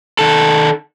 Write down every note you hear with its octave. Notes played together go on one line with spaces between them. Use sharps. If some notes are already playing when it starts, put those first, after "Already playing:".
D#3 A4